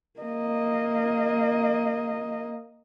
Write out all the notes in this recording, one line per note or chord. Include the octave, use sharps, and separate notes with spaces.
A#3 D#5